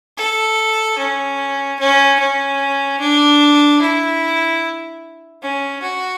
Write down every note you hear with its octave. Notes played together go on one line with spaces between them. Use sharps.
A4
C#4
C#4
C#4
D4
E4
C#4
F#4